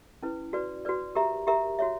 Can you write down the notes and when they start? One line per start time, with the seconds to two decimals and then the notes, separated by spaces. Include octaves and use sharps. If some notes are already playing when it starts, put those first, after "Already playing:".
0.23 C#4 E4 B4
0.53 F#4 B4 D5
0.85 F#4 B4 D5
1.15 G4 A#4 E5 A#5
1.47 G4 A#4 E5 A#5
1.79 F#4 C#5 E5